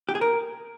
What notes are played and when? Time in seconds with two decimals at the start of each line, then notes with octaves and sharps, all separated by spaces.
0.09 G4
0.15 G#4
0.21 A#4